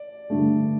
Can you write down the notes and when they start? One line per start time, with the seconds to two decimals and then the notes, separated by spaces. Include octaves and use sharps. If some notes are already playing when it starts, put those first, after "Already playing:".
Already playing: D5
0.30 G2 D3 A3